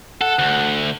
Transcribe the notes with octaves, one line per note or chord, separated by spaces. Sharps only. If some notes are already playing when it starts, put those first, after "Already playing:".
A4 F#5
D2